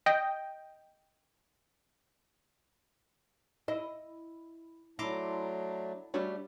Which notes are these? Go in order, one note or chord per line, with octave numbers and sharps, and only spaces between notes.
D#5 G5
E4 D#5
F#3 A3 D4 E4 A#5 C6 D6
G3 A3 D4 F#4 C#5 D5